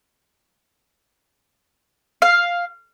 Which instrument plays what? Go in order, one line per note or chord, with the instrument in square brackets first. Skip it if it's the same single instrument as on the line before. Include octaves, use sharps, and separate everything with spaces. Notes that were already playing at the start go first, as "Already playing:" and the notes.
[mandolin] F5